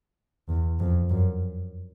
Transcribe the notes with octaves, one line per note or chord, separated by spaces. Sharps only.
E2
F2
F#2